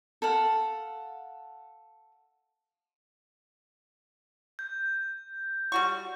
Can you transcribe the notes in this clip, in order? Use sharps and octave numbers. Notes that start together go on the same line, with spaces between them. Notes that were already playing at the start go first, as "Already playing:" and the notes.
A4 F5 F#5
G6
G3 F#4 C#6